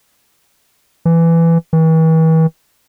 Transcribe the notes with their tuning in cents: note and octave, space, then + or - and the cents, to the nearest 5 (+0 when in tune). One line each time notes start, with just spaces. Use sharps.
E3 +15
E3 -40